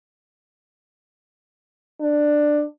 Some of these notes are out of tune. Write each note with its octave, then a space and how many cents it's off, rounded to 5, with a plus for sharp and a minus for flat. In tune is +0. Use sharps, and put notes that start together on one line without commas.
D4 +10